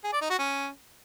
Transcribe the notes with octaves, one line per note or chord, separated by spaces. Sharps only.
G#4
D5
D#4
F#4
C#4